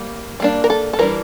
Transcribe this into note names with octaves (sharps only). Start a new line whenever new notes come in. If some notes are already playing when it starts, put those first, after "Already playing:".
Already playing: G3 A#3
G3 A#3 D4
A#4
A4
A4
E3 G3 D4 A#4